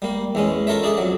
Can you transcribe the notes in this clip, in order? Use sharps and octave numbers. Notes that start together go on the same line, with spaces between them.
G3 A#3
E2 G#3 C#4
F4 A4 A#4 C#5 E5
D4 G#4 A4 D5
F2 F#3